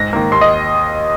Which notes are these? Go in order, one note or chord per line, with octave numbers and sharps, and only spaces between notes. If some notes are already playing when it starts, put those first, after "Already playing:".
Already playing: G#2 A#6
D#3 A#3
D#2 C6
D#5